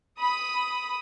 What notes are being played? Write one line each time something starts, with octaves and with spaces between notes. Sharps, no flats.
B5 D#6